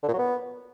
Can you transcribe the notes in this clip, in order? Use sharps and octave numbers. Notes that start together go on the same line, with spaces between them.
D3
A#2
F#3
B3